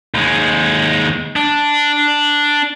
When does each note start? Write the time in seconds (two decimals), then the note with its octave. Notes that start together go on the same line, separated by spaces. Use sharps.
0.14 D#2 G#3
1.36 D4